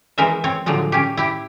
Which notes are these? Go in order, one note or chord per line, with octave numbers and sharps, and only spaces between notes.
E3 G#3 A#4 C5 E5
C4 C#5
A2 D3 F3 F#3 G#3
C#4 G4
E4 G4